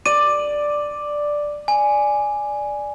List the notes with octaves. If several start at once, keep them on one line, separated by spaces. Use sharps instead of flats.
D5 D#7
G#5